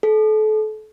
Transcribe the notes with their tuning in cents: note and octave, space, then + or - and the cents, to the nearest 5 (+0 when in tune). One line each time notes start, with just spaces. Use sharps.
A4 -30